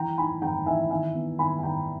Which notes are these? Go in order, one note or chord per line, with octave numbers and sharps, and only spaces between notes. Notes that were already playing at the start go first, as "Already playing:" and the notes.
Already playing: E3 G5 A#5
D#4 G#5 B5
E3 G5 A#5
E3 E5 G#5
D#3 E5 G#5
B3
D#3 G#5 B5
G#5
D#3 G5 A#5